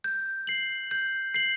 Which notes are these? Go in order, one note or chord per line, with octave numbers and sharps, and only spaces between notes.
G6
C7 F#7
G6
C7 F#7